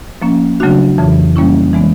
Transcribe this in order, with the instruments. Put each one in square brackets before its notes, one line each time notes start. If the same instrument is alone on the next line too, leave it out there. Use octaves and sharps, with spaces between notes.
[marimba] F3 A#3 C#4
C#3 F#3 A3 D4 F#4
F2 C#3 E3
G3 A#3 C#4 E4
E3 G#3 B3